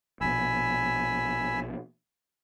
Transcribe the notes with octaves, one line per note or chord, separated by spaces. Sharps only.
A#1 B2 G#5 B5 E6